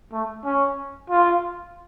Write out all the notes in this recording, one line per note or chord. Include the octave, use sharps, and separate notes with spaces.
A3
C#4
F4